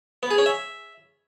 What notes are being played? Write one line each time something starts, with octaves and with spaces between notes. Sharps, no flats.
B3
G#4
C#4
E5